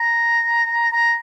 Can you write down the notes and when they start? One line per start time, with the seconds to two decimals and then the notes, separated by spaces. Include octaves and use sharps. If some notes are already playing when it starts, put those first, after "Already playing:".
Already playing: A#5
0.93 A#5